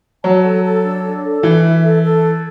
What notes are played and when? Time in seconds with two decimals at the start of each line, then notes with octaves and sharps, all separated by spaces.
0.23 F#3 A5
0.44 A4
0.64 A4
0.84 D4
1.04 D4
1.24 A4
1.43 E3 E5
1.63 E5
1.83 A4
2.03 A4